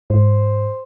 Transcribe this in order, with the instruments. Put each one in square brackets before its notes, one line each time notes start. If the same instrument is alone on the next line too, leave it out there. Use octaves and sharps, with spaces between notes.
[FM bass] G#2 [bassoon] C5